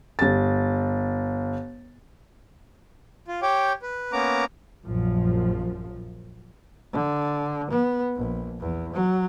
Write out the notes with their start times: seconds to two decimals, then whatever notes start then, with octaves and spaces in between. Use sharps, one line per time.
0.19 G1 A6
3.28 F4
3.42 G4 C#5 G5 D6
3.82 B4
4.12 A#3 B3 C#4 A#5 D6
4.85 A#1 F#2 F3
6.93 D3
7.71 B3
8.16 A#1
8.60 E2
8.93 F#3